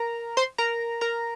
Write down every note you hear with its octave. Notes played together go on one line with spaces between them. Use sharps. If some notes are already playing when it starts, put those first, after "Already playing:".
Already playing: A#4 A#5
C5 C6
A#4 A#5
A#4 A#5